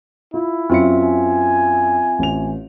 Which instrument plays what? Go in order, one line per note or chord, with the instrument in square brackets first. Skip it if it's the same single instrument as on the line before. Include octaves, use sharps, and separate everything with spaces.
[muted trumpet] E4 [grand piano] F4
[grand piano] F#2 C#7 [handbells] C4 F4 E5
[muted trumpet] G#5
[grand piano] A1 F7